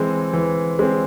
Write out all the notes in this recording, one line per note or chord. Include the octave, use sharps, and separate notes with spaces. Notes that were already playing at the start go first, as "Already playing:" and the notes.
Already playing: E3 G#3 C4
E3
G#3 C4